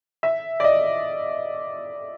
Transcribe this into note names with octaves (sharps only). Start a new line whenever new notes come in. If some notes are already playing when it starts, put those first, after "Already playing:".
E5
D5
D#5